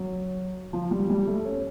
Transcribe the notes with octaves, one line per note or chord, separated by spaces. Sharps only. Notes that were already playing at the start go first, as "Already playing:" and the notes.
Already playing: F#3
F3
G3
G3
A3
C#4